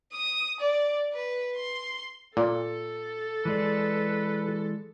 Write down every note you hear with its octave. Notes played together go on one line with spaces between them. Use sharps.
D#6
D5
B4
C6
A#2 A4
E3 G#3 B4 D5